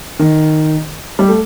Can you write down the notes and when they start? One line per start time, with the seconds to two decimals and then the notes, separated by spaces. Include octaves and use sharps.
0.19 D#3
1.19 G3
1.28 A3